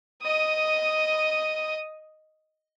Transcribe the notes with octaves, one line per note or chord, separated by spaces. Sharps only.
D#5 D#6